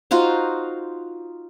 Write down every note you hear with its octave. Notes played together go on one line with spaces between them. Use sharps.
D#4 F4 F#4 C5